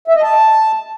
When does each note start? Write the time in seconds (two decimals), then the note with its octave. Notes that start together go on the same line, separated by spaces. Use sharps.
0.08 E5
0.15 D#5
0.23 A5